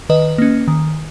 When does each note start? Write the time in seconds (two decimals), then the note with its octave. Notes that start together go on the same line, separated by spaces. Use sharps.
0.09 D#3 B4 D#5
0.38 A#3 C#4
0.68 D#3